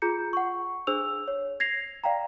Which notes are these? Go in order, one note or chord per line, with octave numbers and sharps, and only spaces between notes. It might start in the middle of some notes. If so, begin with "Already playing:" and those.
F4 G#4 A#5 G6 C#7
F#5 C#6
D4 G#4 C5 E6 F7
C#5
G#6 A#6 C7 F7
D5 F5 G5 A#5